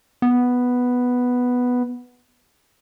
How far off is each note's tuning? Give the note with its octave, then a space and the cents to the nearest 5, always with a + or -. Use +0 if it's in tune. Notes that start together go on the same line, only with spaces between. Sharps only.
B3 +0